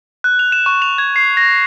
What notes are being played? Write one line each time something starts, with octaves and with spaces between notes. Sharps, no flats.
F#6
F7
E7
C#6
F7
G#6
C7
A#6